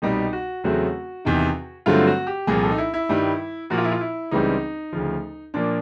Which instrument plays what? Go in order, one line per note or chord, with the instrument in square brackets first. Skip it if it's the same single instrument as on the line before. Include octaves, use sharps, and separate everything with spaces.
[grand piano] C2 B2 G3 D#4
F#4
E2 C#3 F#3 A3 C4 F#4
E2 C3 D#3
G2 D3 F#3 A3 C4 F4
F#4
G4
C2 A#2 F3 G#4
A4
D#4
E4
E4
G2 D#3 G3
A#2 F3 A#3 F#4
F4
E4
F4
E4
C#2 C#3 E3 G3 C4 D#4
D2 C#3 F3
A#2 F3 A#3 D4